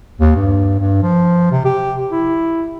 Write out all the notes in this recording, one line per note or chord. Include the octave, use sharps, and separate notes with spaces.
D#2
G2
G2
F3
C3
G4
E4